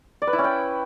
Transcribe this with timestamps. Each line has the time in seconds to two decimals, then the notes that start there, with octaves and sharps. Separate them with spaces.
0.22 D5
0.27 B4
0.33 E4
0.39 C#4
0.44 G5